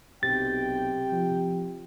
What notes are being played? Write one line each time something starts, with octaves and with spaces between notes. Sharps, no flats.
B1 C3 G5 A6
F3